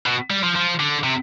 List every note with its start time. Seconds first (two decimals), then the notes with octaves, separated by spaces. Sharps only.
0.06 B2
0.30 G3
0.43 F3
0.56 F3
0.79 D3
1.04 C3